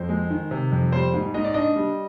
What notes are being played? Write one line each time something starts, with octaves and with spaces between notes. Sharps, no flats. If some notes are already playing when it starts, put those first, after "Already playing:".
Already playing: F2 C5
G#3
D#3
C3
F2
G3 C5
G#2
G#2 D#5
D5
D4 D#5
G3